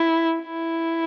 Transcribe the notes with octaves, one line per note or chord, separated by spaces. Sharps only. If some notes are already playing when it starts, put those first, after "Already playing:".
Already playing: E4
E4